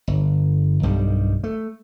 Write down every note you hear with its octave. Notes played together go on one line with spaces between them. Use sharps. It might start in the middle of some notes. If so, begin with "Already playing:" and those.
G1
B1 G2 D#3 G3
A3